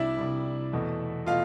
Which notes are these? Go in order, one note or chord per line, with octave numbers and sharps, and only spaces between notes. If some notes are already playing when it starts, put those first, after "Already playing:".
Already playing: C2 C3 G3 D4 E4 D5 E5
C2 C3 G3
E2 B2 A3
B2 A3 F4 F5